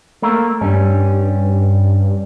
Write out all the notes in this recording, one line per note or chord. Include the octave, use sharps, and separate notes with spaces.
A3 A#3 A#4
G2 G3 C#4